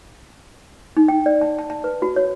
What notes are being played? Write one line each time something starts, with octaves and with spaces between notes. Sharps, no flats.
D#4
G5
D5
A5
A5
A5
B4
F#4
C#5